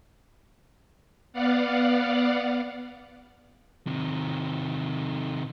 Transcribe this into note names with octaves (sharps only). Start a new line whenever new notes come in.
B3 D5 F5 F#5
C3 D#3